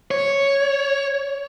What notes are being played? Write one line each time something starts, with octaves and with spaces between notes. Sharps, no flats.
C#5